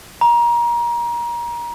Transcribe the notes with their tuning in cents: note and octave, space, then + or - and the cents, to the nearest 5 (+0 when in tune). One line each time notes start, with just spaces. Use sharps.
A#5 +25